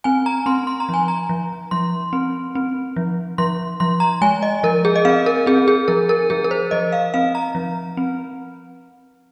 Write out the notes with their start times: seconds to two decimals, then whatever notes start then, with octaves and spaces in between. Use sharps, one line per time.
0.04 C4 G#5
0.26 A#5
0.46 C4 C6
0.67 C6
0.80 A#5
0.89 F3 G#5
1.08 A#5
1.29 F3
1.71 F3 C6
2.13 C4
2.55 C4
2.96 F3
3.38 F3 C6
3.80 F3 C6
4.00 A#5
4.22 G#3 G#5
4.43 D#5
4.63 F3 A#4
4.85 G#4
4.96 D#5
5.05 C4 F5
5.26 A#4
5.46 C4 G#4
5.68 G#4
5.88 F3 A#4
6.09 A#4
6.30 F3 G#4
6.44 A#4
6.51 C5
6.71 F3 D#5
6.92 F5
7.14 C4 F5
7.35 A#5
7.55 F3
7.97 C4